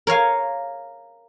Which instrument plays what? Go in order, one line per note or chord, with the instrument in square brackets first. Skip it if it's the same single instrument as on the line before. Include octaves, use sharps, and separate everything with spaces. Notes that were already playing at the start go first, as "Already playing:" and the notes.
[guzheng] A#4 C#5 F5 G#5